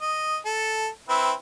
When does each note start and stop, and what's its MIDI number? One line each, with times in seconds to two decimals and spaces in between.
0.01 0.37 75
0.45 0.88 69
1.09 1.32 60
1.09 1.32 64
1.09 1.32 71